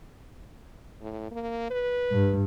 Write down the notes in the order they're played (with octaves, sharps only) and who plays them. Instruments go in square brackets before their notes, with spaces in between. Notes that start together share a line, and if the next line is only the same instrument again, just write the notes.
[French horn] A2
A#3
B4
[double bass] G2